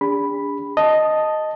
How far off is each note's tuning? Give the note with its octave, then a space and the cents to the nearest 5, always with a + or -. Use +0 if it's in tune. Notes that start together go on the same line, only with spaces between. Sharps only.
D4 -25 G#4 -45 B5 +0
D#5 +0 A5 +0